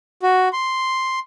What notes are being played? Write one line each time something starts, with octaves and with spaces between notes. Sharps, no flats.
F#4
C6